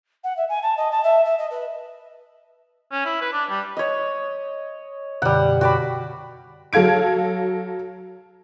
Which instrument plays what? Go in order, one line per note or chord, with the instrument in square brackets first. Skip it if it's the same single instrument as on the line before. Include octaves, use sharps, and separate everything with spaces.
[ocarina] F#5
E5
G#5
A5
D#5
A5
E5
E5
D#5
B4
[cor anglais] C#4
E4
B4
D4
G3
[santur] C#5 D#5
[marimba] F#2 B2 D3 [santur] G3 F#5
[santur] F#4 D5 B5 [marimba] G5
[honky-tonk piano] F#3 A4 F5 G#6 D7